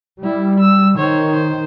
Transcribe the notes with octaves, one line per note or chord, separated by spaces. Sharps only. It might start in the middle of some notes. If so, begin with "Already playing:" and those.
G3 E4
E6
D#3 C5 C#5
C5